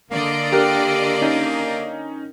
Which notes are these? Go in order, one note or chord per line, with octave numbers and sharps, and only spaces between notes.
D3 A#3 D5 D#5
G4 A#4 F#6
C#4 D#4